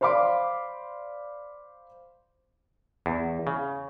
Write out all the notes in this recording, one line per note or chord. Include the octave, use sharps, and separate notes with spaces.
C5 D5 F5 B5 C6 D6
E2
C#3